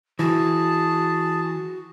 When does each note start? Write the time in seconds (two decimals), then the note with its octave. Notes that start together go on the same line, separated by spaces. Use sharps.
0.19 E3 F#4 G#4 A5